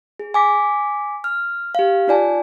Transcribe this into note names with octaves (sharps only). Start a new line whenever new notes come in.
G#4
G#5 D6 B6
F6
G4 F5
D#4 F4 D5 G#5 A5